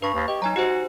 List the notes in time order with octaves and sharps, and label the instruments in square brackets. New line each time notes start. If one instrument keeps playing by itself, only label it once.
[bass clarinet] G2 [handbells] B4 C#6
[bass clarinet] D#2
[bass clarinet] G4 [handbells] D#5
[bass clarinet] F#3 [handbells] D#4 G#5 A#5
[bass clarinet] F#4 [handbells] G4 C5